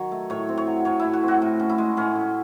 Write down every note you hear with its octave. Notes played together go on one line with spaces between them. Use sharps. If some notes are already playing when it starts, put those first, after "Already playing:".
Already playing: D#3 F#3 C#5
A3
A2 C#5
C4
C#5
F#3
A2 C#5
A2 E4
F#4
C4
F#4
A2
C#4
E4
G#3
A2 C#4
A2